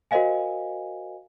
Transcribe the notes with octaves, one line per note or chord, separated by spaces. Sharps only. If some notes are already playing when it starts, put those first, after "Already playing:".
F#4 A#4 C5 D#5 F5 G#5